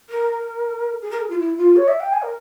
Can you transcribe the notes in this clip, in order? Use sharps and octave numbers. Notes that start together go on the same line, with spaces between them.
A#4
G#4
A#4
G#4
F4
E4
F4
C#5
E5
G5
G#5
A#4